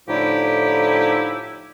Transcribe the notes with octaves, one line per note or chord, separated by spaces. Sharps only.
A2 D3 F3 D#4 E4 G4